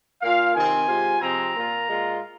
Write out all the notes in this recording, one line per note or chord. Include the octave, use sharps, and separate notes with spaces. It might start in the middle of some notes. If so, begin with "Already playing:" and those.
A#2 A#3 F4 F5
C3 D#3 C4 G#5
C3 G#3 F4
C3 F3 G#3 C4 A#5
A#2 A#3 F4
A#2 G#3 F4